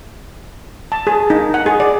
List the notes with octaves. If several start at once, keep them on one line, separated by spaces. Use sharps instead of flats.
A5
G#4
D#4
F#5
G#4
D5